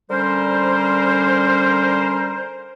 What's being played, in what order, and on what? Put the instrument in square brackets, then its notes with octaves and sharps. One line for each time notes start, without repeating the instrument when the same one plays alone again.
[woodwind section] D3 G3 C#4 A#4 C5